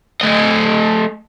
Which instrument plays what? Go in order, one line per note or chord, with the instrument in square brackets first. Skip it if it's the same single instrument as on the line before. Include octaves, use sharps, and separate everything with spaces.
[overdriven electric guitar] A3 D#5